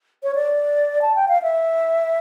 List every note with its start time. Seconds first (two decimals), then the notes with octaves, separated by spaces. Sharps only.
0.23 C#5
0.35 D5
1.02 A5
1.15 G5
1.28 F5
1.42 E5